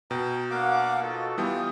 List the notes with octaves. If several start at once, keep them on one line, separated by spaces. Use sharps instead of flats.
B2 G5 A#5
A#3 D4 F5 F#5 D6
D#4 F4 F#4 A4
E3 G3 B3 F4 G5 D#6